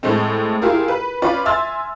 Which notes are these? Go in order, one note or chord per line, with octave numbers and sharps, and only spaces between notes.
A2 G#3 A3 C4
E4 F4 G4 G#4 A#4
B4
C#4 F4 B4 D5
E5 G#5 C6 E6 F6 A6